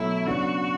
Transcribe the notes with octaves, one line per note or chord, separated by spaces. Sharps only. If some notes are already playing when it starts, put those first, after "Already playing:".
Already playing: B2 F#3 A3 E4
C#3 F#3 B3 D4 F#4